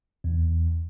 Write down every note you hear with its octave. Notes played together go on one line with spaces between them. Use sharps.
E2